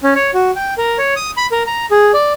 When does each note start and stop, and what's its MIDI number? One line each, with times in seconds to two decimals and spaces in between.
0.03 0.14 61
0.15 0.31 73
0.34 0.51 66
0.56 0.74 79
0.78 0.98 70
0.98 1.14 73
1.16 1.31 87
1.37 1.47 83
1.52 1.63 70
1.67 1.85 82
1.91 2.12 68
2.14 2.33 74